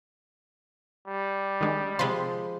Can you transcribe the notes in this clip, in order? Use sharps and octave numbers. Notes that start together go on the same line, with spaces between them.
G3
D#3 G#3 D4
C3 F3 G#3 B5 C6